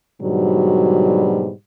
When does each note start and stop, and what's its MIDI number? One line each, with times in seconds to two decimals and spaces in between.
0.21 1.51 44
0.21 1.51 47
0.21 1.51 50
0.21 1.51 54
0.21 1.51 55